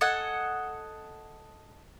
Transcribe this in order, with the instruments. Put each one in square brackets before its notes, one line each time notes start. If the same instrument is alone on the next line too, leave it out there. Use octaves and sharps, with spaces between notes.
[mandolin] A4 D#5 F#5 G#5